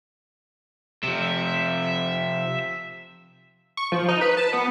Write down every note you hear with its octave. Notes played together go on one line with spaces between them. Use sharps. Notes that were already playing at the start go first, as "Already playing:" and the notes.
C3 F3 E5
C#6
F3
D#4
B4
A5
B3